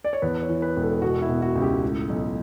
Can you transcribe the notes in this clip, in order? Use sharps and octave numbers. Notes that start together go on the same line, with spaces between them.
D5
C#5
E2 B4
C#5
E3
B4
E1
A4
B2 F#4
E4
B2
F#4
C#2
G4
A2
B1